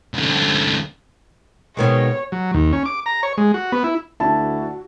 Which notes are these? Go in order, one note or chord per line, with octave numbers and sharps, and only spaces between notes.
C2 D3
B2 D#3 G#3 C#5
F#3
D#2
C#4
D6
A#5
C#5
G#3
F#4
B3
E4
D2 D4 E4 F#4 A5